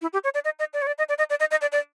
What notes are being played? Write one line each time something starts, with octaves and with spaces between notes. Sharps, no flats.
E4
G4
C#5
D5
D#5
D#5
D5
C#5
D5
D#5
D5
D#5
D5
D#5
D#5
D5
D5